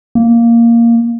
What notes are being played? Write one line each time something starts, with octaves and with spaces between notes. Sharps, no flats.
A#3